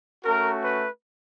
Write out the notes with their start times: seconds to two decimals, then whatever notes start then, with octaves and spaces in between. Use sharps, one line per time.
0.24 A3 C#4 F#4 A#4
0.62 B4